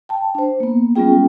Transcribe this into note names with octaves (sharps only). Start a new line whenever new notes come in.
G5 A5
D4 C5
A#3 B3
G3 B3 C#4 F4 G#4 G5